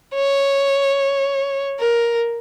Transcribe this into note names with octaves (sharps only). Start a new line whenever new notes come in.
C#5
A#4